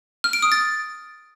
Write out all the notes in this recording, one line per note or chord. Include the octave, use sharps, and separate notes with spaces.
F6
D7
D#6
A6